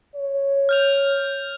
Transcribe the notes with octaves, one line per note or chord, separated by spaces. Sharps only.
C#5
F6 G6 F7